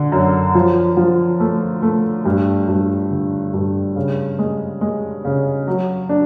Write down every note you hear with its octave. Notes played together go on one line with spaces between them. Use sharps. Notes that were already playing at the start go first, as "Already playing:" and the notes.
Already playing: D3
F#2
F3
F3
A3
A3
G2
G2
D3
G2
C#3
G#3
G#3
C#3
F#3
D4